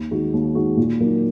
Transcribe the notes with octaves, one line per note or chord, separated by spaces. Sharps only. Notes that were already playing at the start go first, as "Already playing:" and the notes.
Already playing: D#2
D#3 G#3 D#4 F#4
D#2
D#3 G#3 D#4 F#4
A#2
F#3 A#3 D#4